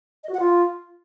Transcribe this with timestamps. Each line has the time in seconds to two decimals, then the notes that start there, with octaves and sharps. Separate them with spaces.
0.24 D#5
0.29 F#4
0.34 F#5
0.40 F4